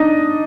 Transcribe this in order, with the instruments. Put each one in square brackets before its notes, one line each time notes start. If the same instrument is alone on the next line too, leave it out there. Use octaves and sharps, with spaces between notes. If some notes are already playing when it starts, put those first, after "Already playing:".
Already playing: [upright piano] D4 D#4 D5 D#5